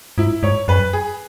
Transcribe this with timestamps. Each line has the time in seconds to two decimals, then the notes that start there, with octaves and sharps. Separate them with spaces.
0.18 G#2 E4
0.43 G#2 C#5
0.68 F#2 B4
0.93 G#4